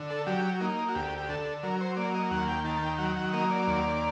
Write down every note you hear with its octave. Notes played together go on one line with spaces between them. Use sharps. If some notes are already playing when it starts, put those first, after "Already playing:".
Already playing: D3
A4
F#3 G4
A#3 D#4
F#4
D2 G4
G4
D3 A4
F#3 A#4
C5
A#3 D5
D#5
D#2 F#5
G5
D#3 A5
A5
G5
F#3 F#5
F#5
A#3 D#5
D5
D#2